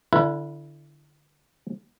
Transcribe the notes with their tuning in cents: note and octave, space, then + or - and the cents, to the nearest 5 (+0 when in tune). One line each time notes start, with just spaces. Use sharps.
D3 +0 E4 +25 B4 -20